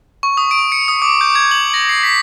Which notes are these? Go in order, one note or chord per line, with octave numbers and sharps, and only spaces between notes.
C#6
D#6
D7
C#7
D#6
D6
G6
G#6
F#7
A#6
C7
B6